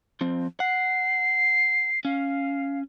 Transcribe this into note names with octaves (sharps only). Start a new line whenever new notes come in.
F3 C4
F#5 C7
C#4 F5